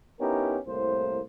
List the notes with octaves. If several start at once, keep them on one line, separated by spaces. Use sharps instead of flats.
B3 C#4 D#4 E4 G4 A#4
C2 A2 A#3 C5